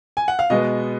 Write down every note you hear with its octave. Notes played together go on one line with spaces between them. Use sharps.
G#5
F#5
F5
B2 G#3 B3 D#5